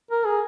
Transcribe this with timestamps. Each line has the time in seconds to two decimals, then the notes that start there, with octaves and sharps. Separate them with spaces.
0.11 A#4
0.26 G#4